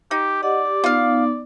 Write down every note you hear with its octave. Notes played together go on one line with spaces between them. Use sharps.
D#4 G4
G4 D5 D#5 F#5
G4
B3 D#4 F4 F5